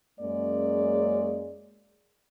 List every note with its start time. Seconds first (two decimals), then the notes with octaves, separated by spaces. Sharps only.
0.20 F#2 G#3 A#3 C#4 G#4 D5